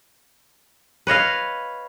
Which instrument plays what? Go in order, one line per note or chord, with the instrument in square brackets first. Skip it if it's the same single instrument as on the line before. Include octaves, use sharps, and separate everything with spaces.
[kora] B4 C#5 D#5 F5